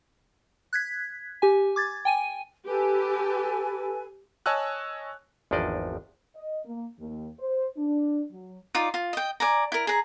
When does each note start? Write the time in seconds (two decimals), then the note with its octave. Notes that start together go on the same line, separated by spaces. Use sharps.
0.73 F#6 G#6 B6
1.42 G4 G#5
1.76 D6 G#6 A6
2.05 G5 G#5 D#7
2.67 G4 A4 B4 G#5
4.46 C#5 D#5 G#5 A5 E6 F#6
5.51 G#1 E2 F3 D4 D5 D#5
6.36 D#5
6.65 A#3
7.00 D#2
7.40 C5
7.77 D4
8.32 F#3
8.75 D#4 F4 D5
8.94 F4
9.13 D#5 G5
9.40 D5 G#5 A#5
9.72 E4 A#4
9.87 G#4 A#5